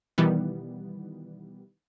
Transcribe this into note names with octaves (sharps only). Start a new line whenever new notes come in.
B2 D#3 E3 G3 B3